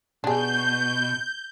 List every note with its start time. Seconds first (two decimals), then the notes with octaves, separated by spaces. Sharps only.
0.24 B2 D4 G#4 G6